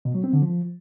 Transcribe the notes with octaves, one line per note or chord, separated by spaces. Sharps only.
B2
F#3
C4
D3
F3